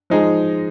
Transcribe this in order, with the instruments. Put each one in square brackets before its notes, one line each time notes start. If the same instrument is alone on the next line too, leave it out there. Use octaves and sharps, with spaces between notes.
[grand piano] F3 G#3 D#4 G#4